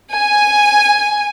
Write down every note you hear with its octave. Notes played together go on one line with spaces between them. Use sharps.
G#5